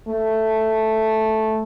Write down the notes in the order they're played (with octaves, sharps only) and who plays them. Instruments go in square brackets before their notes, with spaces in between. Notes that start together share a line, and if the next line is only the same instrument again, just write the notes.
[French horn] A3